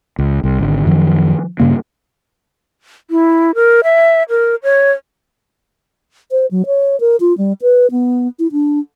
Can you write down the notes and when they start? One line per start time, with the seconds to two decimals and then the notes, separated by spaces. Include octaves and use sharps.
0.19 C#2
0.44 C2
0.59 G#1 D3
0.86 F#2 D#3 F3
1.60 G2 C#3 A#3
3.11 E4
3.55 A#4
3.84 E5
4.29 A#4
4.63 C#5
6.31 C5
6.51 F#3
6.66 C#5
7.00 A#4
7.20 F4
7.38 G3
7.62 B4
7.91 B3
8.39 E4
8.52 D4